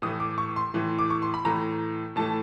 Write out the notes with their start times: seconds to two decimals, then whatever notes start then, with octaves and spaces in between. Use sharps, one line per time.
0.02 A2 E3 A3 D#6
0.20 D6
0.38 C#6
0.56 C6
0.74 A2 E3 A3
0.99 D6
1.10 C#6
1.22 C6
1.34 B5
1.45 A2 E3 A3 A#5
2.16 A2 E3 A3 A5